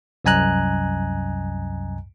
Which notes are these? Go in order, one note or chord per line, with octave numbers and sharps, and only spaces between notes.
C2 F#2 D#5 G#5 A#5 F#6